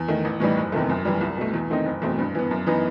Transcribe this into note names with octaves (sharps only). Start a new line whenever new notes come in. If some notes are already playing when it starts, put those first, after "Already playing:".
Already playing: E2
D#3 A3
A1
A2 E3 G3 D#4
F#1
E2 C3 D#3 A3
F#2
E3 G3
C2
B2 A3
E2
D#3 A3 C4 D#4
F#1
E2 B2 A3 C4
G2
E3 B3
F#2
E3 B3 D#4